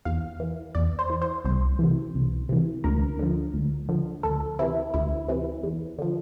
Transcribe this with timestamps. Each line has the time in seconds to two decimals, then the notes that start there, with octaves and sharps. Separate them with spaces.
0.05 E2 F5
0.40 E3
0.75 E2 D5
0.99 C5
1.10 E3
1.22 C5
1.45 C2 C5
1.79 C3 E3
2.15 C2
2.49 C3 E3
2.84 D2 A#4
3.19 D3 F3
3.54 D2
3.89 D3 F3
4.23 D2 A4
4.59 C3 E3 E4
4.94 D2 E4
5.28 C3 E3
5.63 E2
5.99 D3 F3